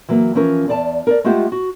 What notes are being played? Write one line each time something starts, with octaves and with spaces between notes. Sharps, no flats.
E3 F#3 A#3
E3 F3 C#4 A#4
E2 D5 A5
A#4 C#5 D5
G#3 A3 F4 G4 C5 F#5
F#4